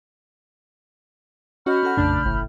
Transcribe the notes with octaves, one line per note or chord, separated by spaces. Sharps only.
C#4 F#4 D#5 B5 F6 G6
C#4 A4 F#5
A#1 F2 C#3 A3 D4
F#1 A2